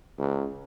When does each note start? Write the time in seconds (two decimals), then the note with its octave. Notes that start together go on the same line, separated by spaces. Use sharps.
0.18 C#2